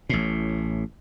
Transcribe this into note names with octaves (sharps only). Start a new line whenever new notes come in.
A1 A2